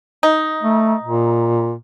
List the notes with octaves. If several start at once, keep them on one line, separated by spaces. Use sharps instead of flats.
D#4
A3
A#2